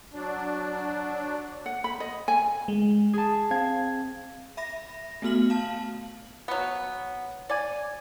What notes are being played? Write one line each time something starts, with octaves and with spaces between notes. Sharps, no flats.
F#3 D4
F#5
B5
D#5
G#5
G#3
G#4 A5
C4 F5 G#6
E5 B5 A#6
A3 B3 F#4 F6 F#7
F5 A5
F#3 B3
D5 G#5